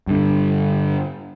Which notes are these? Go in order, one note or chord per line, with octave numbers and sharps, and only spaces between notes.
G2 D3